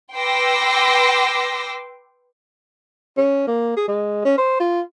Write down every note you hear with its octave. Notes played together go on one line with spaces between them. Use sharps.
B4 G5 C6 D6 E6 A#6
C#4
A#3
G#4
G#3
C#4
C5
F4